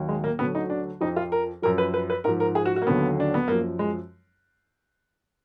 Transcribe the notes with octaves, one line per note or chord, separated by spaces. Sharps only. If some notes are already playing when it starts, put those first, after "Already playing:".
Already playing: D#2 D#3 F#3
G#3
A#3
D2 D3 F#3 B3
D#4
D4
F2 F3 D#4
F4
A#4
F#2 F3 A#4
B4
B4
B4
G#2 F3 A#4
A#4
G#4
F#4
F#4
A#3
D#2 D3 F#3 B3
D4
B3
F#2 F3 A#3
G#3